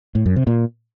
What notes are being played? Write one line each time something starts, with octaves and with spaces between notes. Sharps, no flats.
A2
F#2
C3
A#2